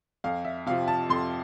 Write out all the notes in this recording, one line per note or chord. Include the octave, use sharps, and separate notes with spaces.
F2 F5
E5
C3 F3 F5
A5
F2 C6